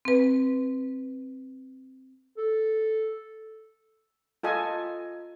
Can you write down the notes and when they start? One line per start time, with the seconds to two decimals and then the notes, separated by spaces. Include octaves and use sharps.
0.05 C4 B4
2.38 A4
4.43 F4 A4 D#5 G#5